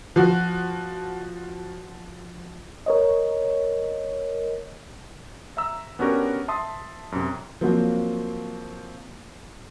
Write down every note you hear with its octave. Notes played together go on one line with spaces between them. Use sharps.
F3 F#4
A#4 C#5 D#5
E5 A#5 E6
B3 C#4 D4 F#4 G4 A#4
E5 A5 C6 D#6
F#2 C3
F3 F#3 A#3 C4 F4 F#4